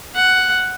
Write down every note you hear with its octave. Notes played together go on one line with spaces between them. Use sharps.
F#5